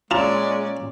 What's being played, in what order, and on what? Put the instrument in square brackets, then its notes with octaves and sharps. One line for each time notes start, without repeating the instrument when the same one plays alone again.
[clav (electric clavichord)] A#2 [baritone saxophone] G#3 [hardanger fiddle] C#4 D5 [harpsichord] F4 A5 A#5